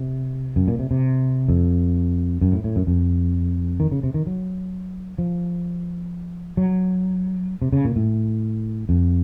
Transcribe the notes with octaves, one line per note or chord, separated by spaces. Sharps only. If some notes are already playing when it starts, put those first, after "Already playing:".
Already playing: C3
F#2
A#2
C3
C3
F2
F#2
A2
A2
F#2
F2
D#3
C#3
C3
D#3
F#3
F3
F#3
C3
C#3
A#2
A2
F2